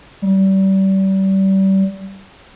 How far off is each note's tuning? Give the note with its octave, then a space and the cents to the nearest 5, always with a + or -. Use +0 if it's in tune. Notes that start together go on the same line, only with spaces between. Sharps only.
G3 -30